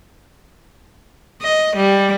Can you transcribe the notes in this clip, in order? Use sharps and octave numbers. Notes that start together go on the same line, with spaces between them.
D#5
G3